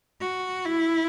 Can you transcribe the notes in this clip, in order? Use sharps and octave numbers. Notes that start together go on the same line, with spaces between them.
F#4
E4